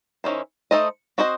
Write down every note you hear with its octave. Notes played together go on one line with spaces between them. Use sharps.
D#3 A3 C#4 E4 C5
A3 D#4 A4 C5 D#5
C4 F#4 C5 D#5